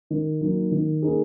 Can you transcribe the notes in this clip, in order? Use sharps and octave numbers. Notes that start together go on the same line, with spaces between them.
D#3
F#3 A#3 D#4
D#3
A#3 D#4 G#4